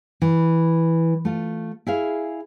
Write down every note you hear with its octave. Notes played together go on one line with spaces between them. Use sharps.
E3
A3 F4
E4 G#4 F5